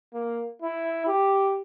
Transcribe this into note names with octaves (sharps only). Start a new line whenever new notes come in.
A#3
E4
G4